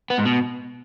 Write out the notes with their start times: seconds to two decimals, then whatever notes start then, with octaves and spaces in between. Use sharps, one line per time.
0.10 B3
0.18 G#2
0.25 B2